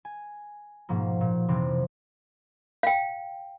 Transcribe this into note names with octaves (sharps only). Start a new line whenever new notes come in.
G#5
G#2 B2 F3 A#3
A#2
F2 C3 E3 F3 C4
F5 G5